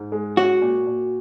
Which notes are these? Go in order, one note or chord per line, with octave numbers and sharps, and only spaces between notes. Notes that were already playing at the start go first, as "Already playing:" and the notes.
Already playing: G#2
G#3
C#4 F#4
A#2
A#2